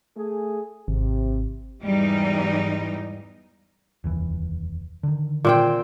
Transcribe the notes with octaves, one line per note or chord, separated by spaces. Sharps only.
A3 G#4
G#1 C3
E2 G#2 E3 G3 D#4
F1 D#2 E3
D3 D#3
A#2 C4 G5